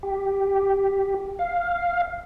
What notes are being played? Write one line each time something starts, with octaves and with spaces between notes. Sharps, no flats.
G4
F5